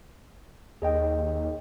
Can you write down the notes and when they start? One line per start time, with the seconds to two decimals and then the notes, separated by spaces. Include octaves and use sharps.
0.82 D#2 G#4 D#5 G5